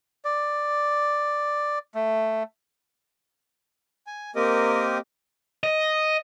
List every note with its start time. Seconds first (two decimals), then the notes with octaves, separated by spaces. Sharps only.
0.25 D5
1.94 A3
4.07 G#5
4.36 A#3 C4 G4 A#4 D#5
5.64 D#5